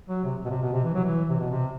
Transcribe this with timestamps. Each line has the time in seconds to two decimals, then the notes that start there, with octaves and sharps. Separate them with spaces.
0.09 F#3
0.24 C3
0.45 B2
0.50 C3
0.62 B2
0.73 C3
0.84 E3
0.94 F#3
1.04 E3
1.29 C3
1.40 B2
1.50 C3